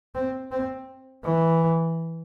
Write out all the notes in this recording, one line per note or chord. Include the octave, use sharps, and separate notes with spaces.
C4
C4
E3